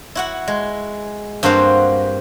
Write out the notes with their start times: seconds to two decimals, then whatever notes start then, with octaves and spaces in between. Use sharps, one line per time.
0.15 E4 F#4 F#5
0.48 G#3
1.43 G2 A#3 C4 F#4 C5 F5